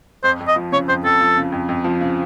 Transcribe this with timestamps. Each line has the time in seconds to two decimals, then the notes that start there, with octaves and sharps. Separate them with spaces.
0.24 F2 C5
0.40 F2
0.48 D#5
0.56 F3
0.72 C#3 C#5
0.88 F2 C5
1.05 F2 A4
1.21 F3
1.37 C#3
1.52 F2
1.69 F2
1.84 F3
2.01 C#3